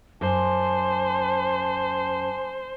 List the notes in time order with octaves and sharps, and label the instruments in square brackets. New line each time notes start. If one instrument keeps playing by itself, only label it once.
[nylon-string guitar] F#2 [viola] C5 [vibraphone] G#5 C6 D6 [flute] A5